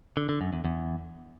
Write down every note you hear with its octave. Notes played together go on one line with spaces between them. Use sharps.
D3
D3
F#2
E2
E2